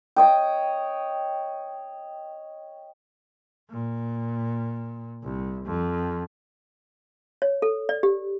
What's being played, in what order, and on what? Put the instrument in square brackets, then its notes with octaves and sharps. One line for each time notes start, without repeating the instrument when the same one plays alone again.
[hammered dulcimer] C#5 D#5 G5
[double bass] A#2
C2
F2
[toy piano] C#5
A4
D5
G4